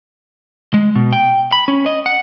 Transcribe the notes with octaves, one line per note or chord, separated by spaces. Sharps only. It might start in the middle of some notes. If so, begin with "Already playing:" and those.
G#3
B2
G5
B5
C#4
D#5
F#5